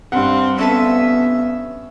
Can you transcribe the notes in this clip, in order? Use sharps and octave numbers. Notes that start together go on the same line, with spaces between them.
G2 C4 F#5
B3 C#4 A4 B4 E5